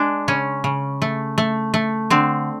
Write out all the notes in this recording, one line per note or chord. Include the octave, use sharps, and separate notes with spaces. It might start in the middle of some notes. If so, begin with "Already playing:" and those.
Already playing: G#3 D4
C#3 C#4
C#3
A3
A3
A3
D3 C4